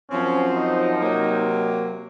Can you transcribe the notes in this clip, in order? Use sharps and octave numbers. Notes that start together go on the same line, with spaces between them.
F#2 F3 C4 C#4
D#4
C3 F#3 A#3